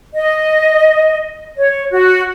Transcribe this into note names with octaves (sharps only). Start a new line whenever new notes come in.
D#5
C#5
F#4